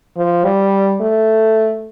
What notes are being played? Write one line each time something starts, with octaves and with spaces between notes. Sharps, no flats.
F3
G3
A3